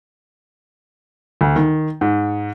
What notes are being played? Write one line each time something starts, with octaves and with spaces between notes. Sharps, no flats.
D2
D#3
G#2